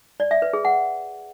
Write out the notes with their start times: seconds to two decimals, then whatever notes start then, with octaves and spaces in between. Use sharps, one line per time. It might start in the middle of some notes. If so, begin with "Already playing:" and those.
0.20 D5
0.31 E5
0.42 B4
0.53 G#4
0.65 F#5